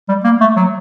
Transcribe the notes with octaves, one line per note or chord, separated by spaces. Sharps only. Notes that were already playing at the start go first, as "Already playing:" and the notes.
G3
A#3
A3
F#3